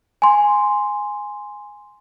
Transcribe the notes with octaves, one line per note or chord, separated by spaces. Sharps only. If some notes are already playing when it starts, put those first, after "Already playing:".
G#5 C6